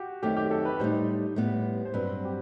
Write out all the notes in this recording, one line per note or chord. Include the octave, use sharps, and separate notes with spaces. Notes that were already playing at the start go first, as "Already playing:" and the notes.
Already playing: F#4 G4
F#2 D#3 A3 C4 G4
G4
A4
B4
A2 G3 D#4 C5
A2 G3 B3
C5
G2 F#3 C4 B4
G4